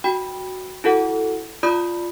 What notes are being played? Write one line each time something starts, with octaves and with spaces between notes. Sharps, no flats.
F#4 G5 B5
E4 F#4 A4 F#5
F4 D5 B5 D#6 G6